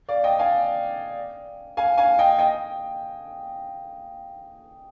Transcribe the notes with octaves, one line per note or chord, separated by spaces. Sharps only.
D5 F5
D#5 G5
F5 G#5
F5 G#5
F5 G#5
D#5 G5
D#5 G5